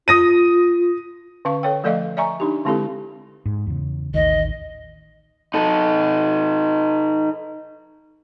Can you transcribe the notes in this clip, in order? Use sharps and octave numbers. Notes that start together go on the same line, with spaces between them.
F4 D#6 A#6 D#7
D3 C#4 F5 C#6
A4 C#5 G5
F3 A3 A4 D5 D#5 F5
D5 E5 G#5 A#5 C#6
D4 D#4 G4
D3 G#3 C4 E4 G4 A4
G#2
E2 C#3
A1 D#2 D#3 D#5
D#4 A4